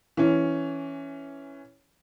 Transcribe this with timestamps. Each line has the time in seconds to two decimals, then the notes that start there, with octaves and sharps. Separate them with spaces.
0.17 E3 C#4